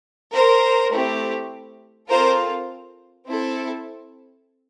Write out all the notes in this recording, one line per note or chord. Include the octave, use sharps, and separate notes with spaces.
A#4 C5
A3 C4 E4 G4
C4 F4 A4 A#4 C5
C4 E4 A4